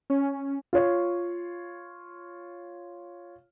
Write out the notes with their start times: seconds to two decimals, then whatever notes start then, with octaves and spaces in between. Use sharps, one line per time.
0.10 C#4
0.73 F4 C#5